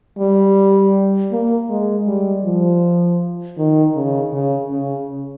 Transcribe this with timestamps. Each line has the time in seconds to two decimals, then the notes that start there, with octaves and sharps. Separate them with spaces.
0.19 G3
1.32 A#3
1.70 G#3
2.07 G3
2.45 F3
3.58 D#3
3.95 C#3
4.33 C#3
4.71 C#3